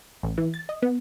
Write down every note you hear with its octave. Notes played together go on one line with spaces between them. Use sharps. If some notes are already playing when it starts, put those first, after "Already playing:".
A1
E3
A6
D#5
B3